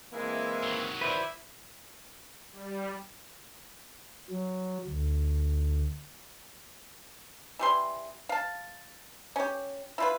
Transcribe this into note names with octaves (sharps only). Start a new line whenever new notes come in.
E3 G#3 A#3 C4 E4
D#3 F#3
E4 B4 C5 D5
G3
F#3
D2
E3 G3 C6
F5 A5
C#4 G4
E4 F4 B4